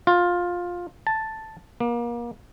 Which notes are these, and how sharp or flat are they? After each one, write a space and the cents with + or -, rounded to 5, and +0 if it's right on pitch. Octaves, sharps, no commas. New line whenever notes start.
F4 +15
A5 +0
A#3 +30